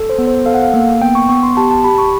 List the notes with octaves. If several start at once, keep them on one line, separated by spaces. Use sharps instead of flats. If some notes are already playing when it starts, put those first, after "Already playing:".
Already playing: A4
C5
B3
C5
A4 F5
F#5
F5
A#3
B3 G5
C#6
B3 C#6
C6
G4 A5
A5
G4 B5
C#6